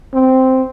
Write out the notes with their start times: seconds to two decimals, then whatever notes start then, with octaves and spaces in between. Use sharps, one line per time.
0.14 C4